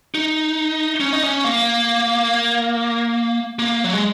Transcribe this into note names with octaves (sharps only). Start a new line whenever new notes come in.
D#4
C#4
D#4
C#4
A#3
A#3
F#3
G#3